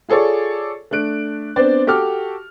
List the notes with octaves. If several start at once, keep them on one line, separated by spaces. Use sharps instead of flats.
F4 G#4 A4 C#5 D5
A3 D4 F#6 D7
B3 C4 D4 C5 D5
F#4 G4 A4 D6 F6